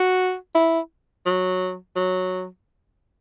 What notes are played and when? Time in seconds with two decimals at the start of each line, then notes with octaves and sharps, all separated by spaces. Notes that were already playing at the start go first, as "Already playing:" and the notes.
Already playing: F#4
0.55 E4
1.26 F#3
1.96 F#3